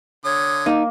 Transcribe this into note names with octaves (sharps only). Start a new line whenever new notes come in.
D3 C#5 D#6
A#3 D#4